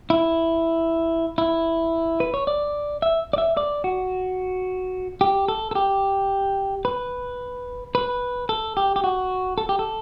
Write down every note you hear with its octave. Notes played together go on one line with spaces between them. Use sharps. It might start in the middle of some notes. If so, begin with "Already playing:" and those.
E4
E4
B4
C#5
D5
E5
D5
E5
D5
F#4
G4
A4
A4
G4
B4
B4
A4
G4
G4
F#4
A4
G4
A4